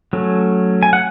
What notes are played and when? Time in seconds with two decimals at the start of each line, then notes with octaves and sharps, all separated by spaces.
0.13 F#3 A3 C#4
0.83 G#5
0.93 F#5